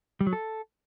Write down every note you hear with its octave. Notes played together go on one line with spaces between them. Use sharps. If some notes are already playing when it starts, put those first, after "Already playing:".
G3
F#3
A4